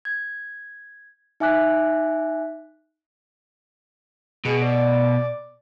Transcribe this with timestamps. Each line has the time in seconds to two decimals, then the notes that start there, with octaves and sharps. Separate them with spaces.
0.05 G#6
1.40 D#4 E5 G#5 D6 F#6 B6
4.45 B2 G#4
4.62 D5